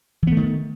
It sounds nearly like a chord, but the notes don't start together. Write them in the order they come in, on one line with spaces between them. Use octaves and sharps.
E3 B3 A3 D#3